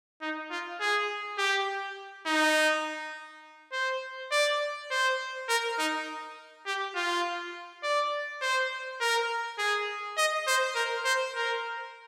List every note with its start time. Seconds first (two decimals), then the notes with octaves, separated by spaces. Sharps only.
0.21 D#4
0.51 F4
0.80 G#4
1.38 G4
2.26 D#4
3.72 C5
4.32 D5
4.91 C5
5.49 A#4
5.79 D#4
6.66 G4
6.96 F4
7.83 D5
8.42 C5
9.01 A#4
9.59 G#4
10.17 D#5
10.47 C5
10.75 A#4
11.05 C5
11.35 A#4